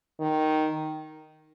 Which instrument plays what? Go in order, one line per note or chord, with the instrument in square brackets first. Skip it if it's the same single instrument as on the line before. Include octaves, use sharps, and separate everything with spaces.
[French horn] D#3